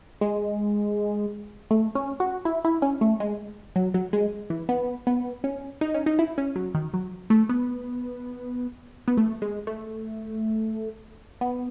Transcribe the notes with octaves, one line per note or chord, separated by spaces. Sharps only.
G#3
A3
C#4
F#4
E4
E4
C#4
A3
G#3
F#3
F#3
G#3
E3
B3
B3
C#4
D#4
C#4
D#4
E4
C#4
F#3
D#3
F#3
A3
B3
B3
A3
G#3
A3
B3